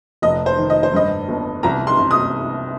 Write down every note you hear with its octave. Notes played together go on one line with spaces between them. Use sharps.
F1 D#5
C5
D#3
D#5
C5
G2 D#5
G1
C2 A#5
C6
C3
D#6